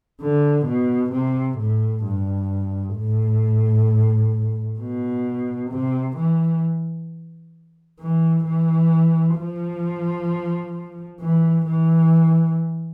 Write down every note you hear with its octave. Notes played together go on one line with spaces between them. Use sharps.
D3
B2
C3
A2
G2
A2
B2
C3
E3
E3
E3
F3
E3
E3